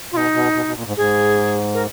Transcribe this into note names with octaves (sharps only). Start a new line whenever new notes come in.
B2 D#4 F4
B2
B2
B2
A#2
G#2
G#2 G#4
A#4